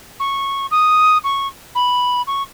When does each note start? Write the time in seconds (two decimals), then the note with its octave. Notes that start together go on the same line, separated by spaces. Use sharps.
0.20 C#6
0.71 D#6
1.24 C#6
1.75 B5
2.27 C#6